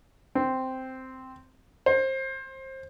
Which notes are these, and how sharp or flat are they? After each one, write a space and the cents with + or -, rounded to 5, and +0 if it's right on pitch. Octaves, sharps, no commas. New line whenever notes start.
C4 -5
C5 +25